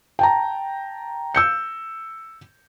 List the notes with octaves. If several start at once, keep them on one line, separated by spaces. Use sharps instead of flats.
G5 A5 A#5
E6 G6 C#7